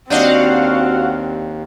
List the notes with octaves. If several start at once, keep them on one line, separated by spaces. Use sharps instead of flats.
D#2 G3 C4 D4 F#4 D#5 F5 F#5